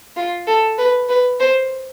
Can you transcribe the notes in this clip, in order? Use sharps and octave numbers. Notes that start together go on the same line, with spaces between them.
F4
A4
B4
B4
C5